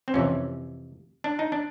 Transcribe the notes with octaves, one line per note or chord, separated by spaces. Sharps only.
C4
F2 C3 E3 C#4
D4
D#4
D4